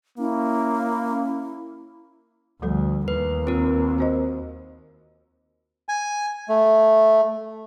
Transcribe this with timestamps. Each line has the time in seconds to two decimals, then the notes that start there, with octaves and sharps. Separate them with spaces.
0.18 A#3 C#4 E4
2.62 D2 F3 G3 A4
3.08 D#2 B4
3.47 C4 F4 A#4
3.98 F#4 C5 D#5
5.89 G#5
6.48 A3